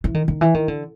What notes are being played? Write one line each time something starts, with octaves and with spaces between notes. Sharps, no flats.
E3
D#3
D#3
E3
D#3
D3